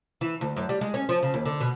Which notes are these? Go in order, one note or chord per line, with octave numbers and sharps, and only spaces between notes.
E3
D2
F#2
G3
G#3
C#4
F3
C#3
D#2
D3
B2